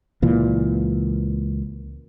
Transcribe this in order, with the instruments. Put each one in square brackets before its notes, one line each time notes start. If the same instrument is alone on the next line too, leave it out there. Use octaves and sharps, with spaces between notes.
[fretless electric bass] C#2 A#2 E3